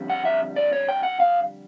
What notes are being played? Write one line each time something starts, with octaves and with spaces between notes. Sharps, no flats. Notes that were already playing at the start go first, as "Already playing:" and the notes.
Already playing: F2 D3 G3
F#5
E5
D5
C#5
G5
F#5
F5